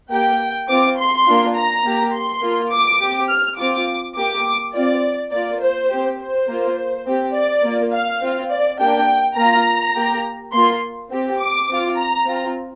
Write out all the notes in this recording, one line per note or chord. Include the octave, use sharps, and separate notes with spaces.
A#3 G4 G5
C4 F4 D6
C6
A#3 D4 F4
A#5
A#3 G4
C6
A#3 F4
D6
C4 G4
F6
C4 F4 D6
A#3 G4 D6
C4 F4 D5
A#3 F4 D5
C5
C4 G4
C5
A#3 F4
C4 G4
D5
A#3 F4
F5
C4 F4
D5
A#3 D4 G4 G5
A#3 F4 A#5
A#3 G4
A#3 F4 C6
C4 G4
D6
C4 F4
A#5
C4 F4